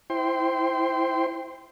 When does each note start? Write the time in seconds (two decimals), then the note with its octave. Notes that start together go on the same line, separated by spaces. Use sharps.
0.10 E4 C5 G5 C6